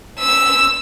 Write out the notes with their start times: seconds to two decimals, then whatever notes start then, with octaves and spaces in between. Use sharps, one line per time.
0.20 E6